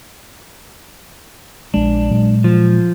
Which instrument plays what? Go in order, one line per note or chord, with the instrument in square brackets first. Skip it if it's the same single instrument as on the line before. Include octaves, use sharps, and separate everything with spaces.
[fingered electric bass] A#1 G#3 [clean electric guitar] D4
[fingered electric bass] A#2 F#3 G#3
[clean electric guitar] F3